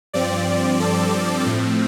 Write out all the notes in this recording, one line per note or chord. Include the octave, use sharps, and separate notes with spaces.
G2 F3 C4 D5
A4
A4
A2 F3 A3 C4